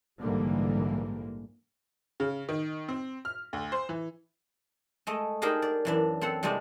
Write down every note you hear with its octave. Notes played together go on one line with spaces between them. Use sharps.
A#1 G#2 D3 E3 G3 A#3
C#3
D#3
C4
F6
D2
C5
E3
G#3 A3 D#5
D4 D#4 G4 G#4 A#4 C5
D5
F#2 E3 D4
C4 A4 F#5
C3 G3 G#3 C4 D4